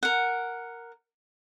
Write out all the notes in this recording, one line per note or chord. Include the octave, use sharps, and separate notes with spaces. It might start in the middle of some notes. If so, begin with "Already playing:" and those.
A#4 F#5